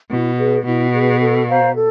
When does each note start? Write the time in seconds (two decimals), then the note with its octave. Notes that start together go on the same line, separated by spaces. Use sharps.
0.10 B2 E4
0.37 G#4 B4
0.65 B2 E4
0.93 G#4 B4
1.21 A4
1.48 C5 F5 A#5
1.76 A4